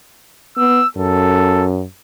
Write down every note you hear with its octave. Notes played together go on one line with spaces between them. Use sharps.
B3 E6
F#2 A4